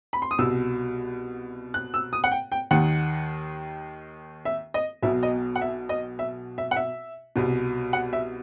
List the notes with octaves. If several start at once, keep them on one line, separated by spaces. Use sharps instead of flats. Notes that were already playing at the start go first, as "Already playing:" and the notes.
B5
C6
D#6
C2 B2 E6
F#6
E6
D#6
F#5
G5
G5
D#2 D#3 F#5
E5
D#5
B1 B2 E5
D#5
F#5
E5
D#5
E5
E5
F#5
E5
C2 B2
F#5
E5